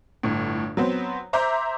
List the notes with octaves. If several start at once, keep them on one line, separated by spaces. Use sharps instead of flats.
G1 A2
F#3 B3 C4
C5 E5 A#5 C6 D6 G6